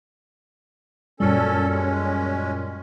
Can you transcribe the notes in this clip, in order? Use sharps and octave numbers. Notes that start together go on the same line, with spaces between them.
F#2 A#2 G3 C#4 A4
G#3 C#4